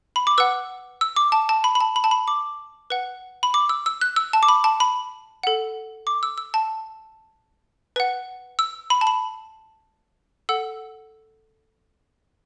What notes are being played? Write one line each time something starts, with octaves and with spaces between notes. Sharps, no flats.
B5
D6
B4 F#5 E6
E6
D6
A5
A5
B5
B5
A5
B5
A5
B5
D6
B4 F#5
B5
D6
E6
E6
F#6
E6
A5
D6
B5
A5
B5
A4 F#5
D6
E6
E6
A5
B4 F#5
E6
B5
A5
B5
A4 F#5 E6